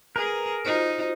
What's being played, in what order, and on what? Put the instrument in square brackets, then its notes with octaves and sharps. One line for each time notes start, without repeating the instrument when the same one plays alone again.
[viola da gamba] G#4 [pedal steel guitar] A#4 [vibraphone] B4
[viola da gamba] D#4 [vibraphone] F4 F#4 C5